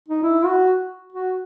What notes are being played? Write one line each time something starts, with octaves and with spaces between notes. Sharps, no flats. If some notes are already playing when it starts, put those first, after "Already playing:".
D#4
E4
F#4
F#4